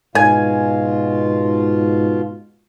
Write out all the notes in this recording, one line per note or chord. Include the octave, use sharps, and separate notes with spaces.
G#2 B2 F4 G#5